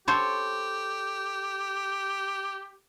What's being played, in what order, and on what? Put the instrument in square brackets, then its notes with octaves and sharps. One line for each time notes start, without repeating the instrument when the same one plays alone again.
[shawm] G4 [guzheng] A4 C5 C#5